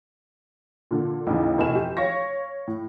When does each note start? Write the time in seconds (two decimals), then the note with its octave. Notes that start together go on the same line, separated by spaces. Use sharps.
0.91 A#2 D3
1.27 A1 D#2 C#3
1.58 F1 B2 G#5 E7
1.75 G4
1.97 C#5 F5 C#6 A#6
2.67 A2